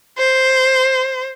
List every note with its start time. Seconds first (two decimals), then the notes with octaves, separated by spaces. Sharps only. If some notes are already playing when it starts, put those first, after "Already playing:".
0.18 C5